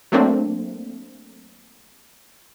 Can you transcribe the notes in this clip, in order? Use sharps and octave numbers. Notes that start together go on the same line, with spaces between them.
F#3 A3 A#3 C4 D4